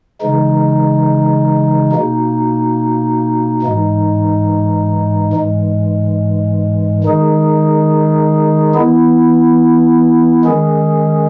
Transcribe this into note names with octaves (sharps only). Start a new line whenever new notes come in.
C#3 E3 G#3 D#4
B2 A#3 D#4
G#2 E3 G#3 D#4
G#2 E3 G#3
D#3 G#3 D#4 G#4
E3 B3 E4
D#3 G#3 C#4 G#4